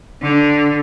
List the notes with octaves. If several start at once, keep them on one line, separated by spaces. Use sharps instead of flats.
D3